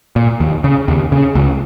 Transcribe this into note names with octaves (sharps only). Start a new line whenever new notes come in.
A#2
D#2
C#3
D#2
C#3
C#2